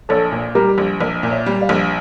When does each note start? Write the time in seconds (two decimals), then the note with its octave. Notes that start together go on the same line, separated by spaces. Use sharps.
0.09 A#1 A4 C#5
0.32 A#2
0.55 G3 G4 A#4
0.78 A#1
1.01 A#1 A#4 D5
1.23 A#2
1.31 C#5 E5
1.46 G3
1.61 D5 F5
1.69 A#1